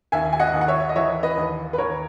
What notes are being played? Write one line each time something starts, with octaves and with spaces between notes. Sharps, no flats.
D#2 E5 G#5
G#5
D#5 F#5
D#2
F#5
C#5 E5
D#5
E3 C#5 E5
B4 D#5
D#2
B4
D#2 A#4 C#5